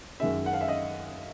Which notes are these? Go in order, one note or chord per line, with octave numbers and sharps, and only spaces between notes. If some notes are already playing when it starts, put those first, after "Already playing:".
F#2 D#3 G#3 E5
F#5
F5
E5
D#5